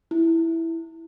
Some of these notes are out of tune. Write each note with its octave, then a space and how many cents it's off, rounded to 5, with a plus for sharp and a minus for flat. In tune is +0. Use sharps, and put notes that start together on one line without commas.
E4 +0